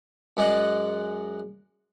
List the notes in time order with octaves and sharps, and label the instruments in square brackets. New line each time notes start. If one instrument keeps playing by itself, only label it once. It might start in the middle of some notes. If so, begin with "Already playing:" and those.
[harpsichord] F#2 G#3 D5 D#5 F#5